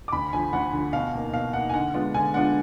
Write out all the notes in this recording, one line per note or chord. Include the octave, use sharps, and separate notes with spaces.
D6
D2 B5
D3 F3 G#5
D2 F#5
D3 F3
B2 F5
A#3 D#4
B2 F5
A#3 D#4 F#5
G#5
D3 F#5
G#3 B3 D4 F4
D3 G#5
G#3 B3 D4 F4 F#5